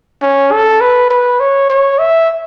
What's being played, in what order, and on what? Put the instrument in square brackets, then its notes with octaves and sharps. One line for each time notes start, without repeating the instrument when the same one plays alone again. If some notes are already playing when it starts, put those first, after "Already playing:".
[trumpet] C#4
A4
B4
B4
C#5
C#5
E5